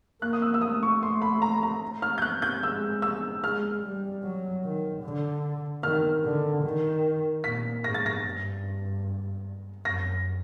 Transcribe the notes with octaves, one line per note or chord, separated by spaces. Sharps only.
A#3 F#6
D#6
E6
E6
A3 D#6
C#6
C6
B5
A#5
A#5
F6
G6
F#6
G6
G#3 E6
E6
G#3 F6
G3
F#3
D#3
D3
D#3 F6
D3
D#3
A#2 B6
G#2 A#6
A6
A#6
G2
F#2 A#6